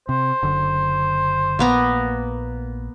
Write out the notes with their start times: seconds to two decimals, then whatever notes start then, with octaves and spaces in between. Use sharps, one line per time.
0.09 C3 C5
0.42 F#1 D3
1.59 A#1 A#3 B3 A#5